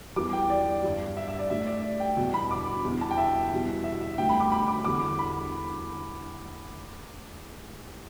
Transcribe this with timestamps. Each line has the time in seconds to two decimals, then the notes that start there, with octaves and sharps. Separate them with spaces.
0.16 E2 E3 G3 D6
0.33 G5
0.50 D5
0.83 G2 G3
1.17 E5
1.28 E5
1.39 D5
1.50 A2 G3 E5
1.67 D5
2.00 G5
2.17 E2 B2 G3
2.34 B5
2.51 D6
2.85 E2 B2 G3
3.01 A5
3.11 G5
3.18 E5
3.51 E2 B2 G3
3.84 E5
4.01 E5
4.18 A2 G3 G5
4.29 B5
4.40 D6
4.52 B5
4.68 D6
4.85 E2 D3 G3 D6
5.19 B5